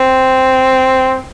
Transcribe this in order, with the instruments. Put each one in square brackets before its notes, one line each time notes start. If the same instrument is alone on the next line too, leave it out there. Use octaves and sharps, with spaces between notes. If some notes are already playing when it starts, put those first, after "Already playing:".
Already playing: [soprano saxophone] C4